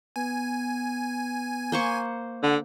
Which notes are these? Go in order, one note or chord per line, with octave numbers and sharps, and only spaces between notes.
B3 G#5
A#3 C5 C#6
D3 F#5